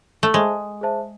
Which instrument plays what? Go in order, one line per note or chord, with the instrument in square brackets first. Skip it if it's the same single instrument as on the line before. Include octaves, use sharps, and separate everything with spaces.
[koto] A3
[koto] G#3 [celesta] G#4 C5 E5 A5
[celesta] G#4 C5 E5 A5